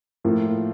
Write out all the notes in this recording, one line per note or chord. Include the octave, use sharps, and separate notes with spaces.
A2 F3 A#3